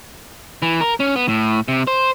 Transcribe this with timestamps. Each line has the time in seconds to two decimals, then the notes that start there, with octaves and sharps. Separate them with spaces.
0.62 E3
0.81 A#4
1.00 C#4
1.16 B3
1.28 A2
1.68 C3
1.87 C5